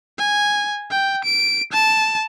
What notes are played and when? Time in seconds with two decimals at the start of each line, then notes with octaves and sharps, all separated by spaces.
0.19 G#5
0.91 G5
1.24 D7
1.72 A5